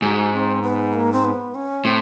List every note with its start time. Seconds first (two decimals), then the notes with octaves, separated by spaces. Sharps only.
0.02 G#2 F#4
0.33 C4
0.63 B3
0.93 A#3
1.12 C4
1.24 B3
1.55 C#4
1.85 A2 C4